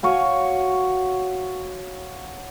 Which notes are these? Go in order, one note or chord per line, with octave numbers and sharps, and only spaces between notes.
F#4 C#5 F5 G#5